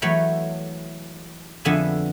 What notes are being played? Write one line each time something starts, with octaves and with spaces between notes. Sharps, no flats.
E3 F#3 A3 C#5 G5 B5
F2 D3 B3 E5 G#5 B5